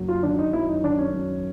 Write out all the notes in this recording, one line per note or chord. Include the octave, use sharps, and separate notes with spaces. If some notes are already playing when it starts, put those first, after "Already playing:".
Already playing: F#1 F#3
F4
D#3 D4
D#4
F#2 E4
D#4
D#3 D4
C#4
F#2